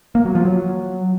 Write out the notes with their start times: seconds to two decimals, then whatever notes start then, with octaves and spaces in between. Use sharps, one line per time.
0.15 A#3
0.25 F#3
0.35 F3
0.45 F#3